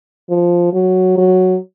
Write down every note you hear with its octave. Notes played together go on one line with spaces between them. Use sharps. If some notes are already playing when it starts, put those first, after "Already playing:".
F3
F#3
F#3